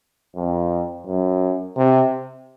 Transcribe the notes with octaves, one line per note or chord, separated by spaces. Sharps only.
F2
F#2
C3